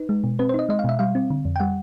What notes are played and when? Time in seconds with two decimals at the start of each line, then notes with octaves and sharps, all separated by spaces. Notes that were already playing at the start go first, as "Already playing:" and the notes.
Already playing: D#4 B4
0.09 G#3
0.24 B2
0.39 C4 B4
0.49 C5
0.54 D#4 D#5
0.69 G#3 D#5
0.79 F5
0.84 B2 E5
0.99 G3 F5
1.15 C4
1.30 D3
1.45 F2
1.56 G5
1.60 G3 F#5